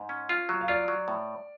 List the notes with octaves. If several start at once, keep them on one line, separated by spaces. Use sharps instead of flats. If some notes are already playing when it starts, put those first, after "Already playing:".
Already playing: G#2
C#4
F4
F#3
F5
F4 D5
F#3
A2